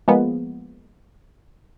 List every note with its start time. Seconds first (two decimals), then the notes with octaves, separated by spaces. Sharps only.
0.08 F3 G#3 A#3 B3